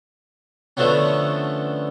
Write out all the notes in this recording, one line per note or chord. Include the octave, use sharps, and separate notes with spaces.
D3 F3 A3 B3 C#4